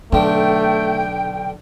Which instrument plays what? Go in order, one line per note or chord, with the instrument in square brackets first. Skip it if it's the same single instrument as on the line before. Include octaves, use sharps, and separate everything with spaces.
[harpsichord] B1 D3 [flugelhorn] A3 [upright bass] D4 [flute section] G5